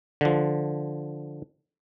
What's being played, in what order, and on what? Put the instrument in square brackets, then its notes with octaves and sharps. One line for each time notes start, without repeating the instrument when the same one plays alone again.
[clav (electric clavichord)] D3 F3